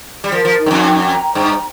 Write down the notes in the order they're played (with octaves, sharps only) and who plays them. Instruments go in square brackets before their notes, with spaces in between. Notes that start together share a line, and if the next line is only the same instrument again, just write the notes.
[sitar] G3
[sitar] F3 [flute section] A#4
[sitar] F3
[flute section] D#4
[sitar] G2
F2
[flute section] G5
A#5
[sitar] G2 [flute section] C5